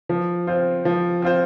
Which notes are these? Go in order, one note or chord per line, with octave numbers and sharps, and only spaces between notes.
F3
C4 F4 C5
F3
C4 F4 C5